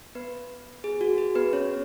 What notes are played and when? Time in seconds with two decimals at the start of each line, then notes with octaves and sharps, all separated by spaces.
0.15 B3 B4
0.84 G#4
1.01 F#4
1.18 G#4
1.35 B3 B4
1.53 C#4 C#5